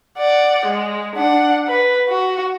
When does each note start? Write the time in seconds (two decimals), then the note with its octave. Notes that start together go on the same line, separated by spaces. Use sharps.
0.18 D5 F#5
0.66 G#3
1.15 D4 F#5
1.68 B4
2.09 F#4